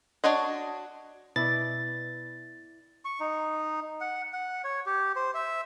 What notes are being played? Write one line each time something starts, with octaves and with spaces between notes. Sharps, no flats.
D4 F#4 C#5 D#5
B2 E4 D5 A6
C#6
D#4
F#5
F#5
C#5
G4
C5
E5